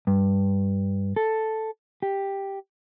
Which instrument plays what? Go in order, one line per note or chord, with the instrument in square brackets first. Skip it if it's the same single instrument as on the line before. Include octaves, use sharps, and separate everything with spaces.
[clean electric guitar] G2
A4
G4